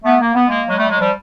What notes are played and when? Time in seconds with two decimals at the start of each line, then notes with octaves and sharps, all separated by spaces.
0.04 A3 B3
0.21 A#3
0.34 B3
0.48 G#3 A#3
0.68 F#3 G#3
0.78 G3 A3
0.89 F#3 G#3
1.00 F3 G3